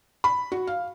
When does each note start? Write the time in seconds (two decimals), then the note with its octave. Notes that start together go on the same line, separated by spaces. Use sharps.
0.24 B5
0.52 F#4
0.67 F5